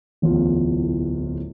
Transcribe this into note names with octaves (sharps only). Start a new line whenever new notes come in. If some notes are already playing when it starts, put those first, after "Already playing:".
D1 A1 E2 F4